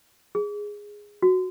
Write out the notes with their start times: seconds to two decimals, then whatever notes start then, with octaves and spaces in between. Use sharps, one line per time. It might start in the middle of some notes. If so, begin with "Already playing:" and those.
0.35 G#4
1.22 F#4